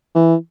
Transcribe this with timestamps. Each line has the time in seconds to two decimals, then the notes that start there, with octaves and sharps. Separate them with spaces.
0.15 E3